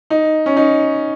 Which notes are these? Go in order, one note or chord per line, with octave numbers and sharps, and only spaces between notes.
D#4
C#4
D#4